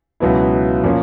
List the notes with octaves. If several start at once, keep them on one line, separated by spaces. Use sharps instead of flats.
C#2 B2 F#3 B3 E4
A#2 F3 A#3 C#4